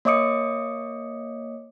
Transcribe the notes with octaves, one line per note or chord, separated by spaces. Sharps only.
A#3 C#5 D#5 D6 D#6 C#7